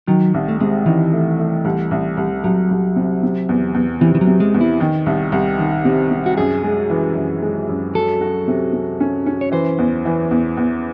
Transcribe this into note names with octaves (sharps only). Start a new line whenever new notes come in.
D#3 F#3
C2
A3
C3 G#3
D#3 E3
A3
A3
C2
C2
C2
C2 F#3
C2
C3
C3
E2
E2
C3 E3
E3
F#3
C3
G#3
E2
E4
D#3
C2
C2
D#3
C3
C3
F#4
F#2 G#4
G#3
E3
F#2
G#3
F#2
F#3 A4
F#4
C3
C3
C#4
C#4
C#5
E3 C5
E2
E3
E2
E2